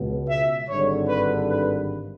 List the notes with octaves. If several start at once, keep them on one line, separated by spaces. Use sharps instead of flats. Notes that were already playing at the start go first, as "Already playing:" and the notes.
Already playing: C#2 B2
E5
G#1 G2 D3 C#5
B4
B4